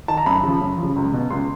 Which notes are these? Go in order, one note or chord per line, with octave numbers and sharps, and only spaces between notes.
D#3 A5
A#5
F#2 B5
C#3 F3
F#2
C#3 F3
C#2
B2
C#2 C6